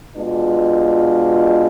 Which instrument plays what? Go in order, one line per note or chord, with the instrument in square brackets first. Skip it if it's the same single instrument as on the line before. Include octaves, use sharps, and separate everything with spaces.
[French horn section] B2 G#3 D4 F4